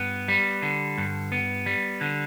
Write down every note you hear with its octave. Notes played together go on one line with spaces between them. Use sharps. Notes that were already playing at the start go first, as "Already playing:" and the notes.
Already playing: G2 B3
G3
D3
G2
B3
G3
D3